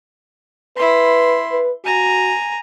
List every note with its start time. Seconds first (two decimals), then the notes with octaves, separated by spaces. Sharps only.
0.77 E4 B4 C6
1.51 B4
1.84 F#4 G#5 A#5